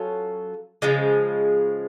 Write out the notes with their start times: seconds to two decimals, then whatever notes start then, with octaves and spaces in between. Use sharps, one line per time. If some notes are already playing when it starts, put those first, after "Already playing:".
Already playing: F#3 C#4 F4 A4
0.82 C#3 F3 G#3